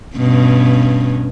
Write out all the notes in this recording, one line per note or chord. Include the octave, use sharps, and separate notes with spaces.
G2 B2 C#4